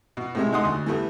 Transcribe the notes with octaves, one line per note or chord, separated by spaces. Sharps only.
B2
A2 C3 G#3
G#3 D#4 F#5 C6 D#6
D2
E3 G3 A3 B3